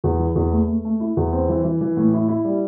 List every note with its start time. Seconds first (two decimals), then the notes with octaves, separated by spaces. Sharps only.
0.04 E2
0.19 E3
0.36 E2
0.52 A3
0.67 A3
0.85 A3
1.00 E4
1.17 E2
1.32 C4
1.49 E3
1.64 E3
1.81 E3
1.97 A2
2.14 E4
2.29 E4
2.45 G3